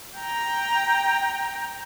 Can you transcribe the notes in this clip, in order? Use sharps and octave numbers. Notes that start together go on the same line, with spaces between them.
G5 A#5